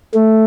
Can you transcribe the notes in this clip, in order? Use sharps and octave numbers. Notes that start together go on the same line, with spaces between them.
A3